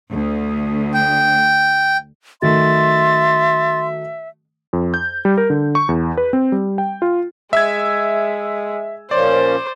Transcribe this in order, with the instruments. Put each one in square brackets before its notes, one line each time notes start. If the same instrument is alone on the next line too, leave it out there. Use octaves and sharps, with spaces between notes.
[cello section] D2
[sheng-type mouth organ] G5
[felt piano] D#3 F#3 A3 [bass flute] E5 [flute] C6 [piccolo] A6
[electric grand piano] F2
G6
G3
A#4
D3
C#6
E2
B4
C4
G3
G5
F4
[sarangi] G#3 [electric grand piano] E5 E6 G#6
[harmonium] A#2 F3 C#4 [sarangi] C5 [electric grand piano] D5